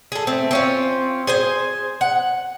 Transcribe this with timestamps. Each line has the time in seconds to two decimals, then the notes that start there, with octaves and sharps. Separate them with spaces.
0.12 G#4 A4
0.27 A3 C4
0.51 C4 C#4 F4
1.27 G#4 C5 G#5
2.01 F#5